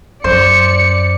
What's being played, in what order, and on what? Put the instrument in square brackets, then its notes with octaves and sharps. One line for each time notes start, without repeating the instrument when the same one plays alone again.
[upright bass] F#2 [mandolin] C5 [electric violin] D5 C#7